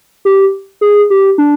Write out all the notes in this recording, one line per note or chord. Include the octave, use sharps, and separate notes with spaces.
G4
G#4
G4
D4